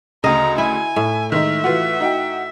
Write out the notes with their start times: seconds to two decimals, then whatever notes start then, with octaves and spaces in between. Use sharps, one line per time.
0.24 D2 C#3 D#5 F5 A#5
0.58 E4 G#5
0.96 A2 E5
1.32 D#3 G#3 D#4 E5
1.64 E3 F4 F#4
2.00 D#4 F#4 G5